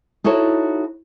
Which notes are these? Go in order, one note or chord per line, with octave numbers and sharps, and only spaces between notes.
D#4 E4 F#4 A4 C#5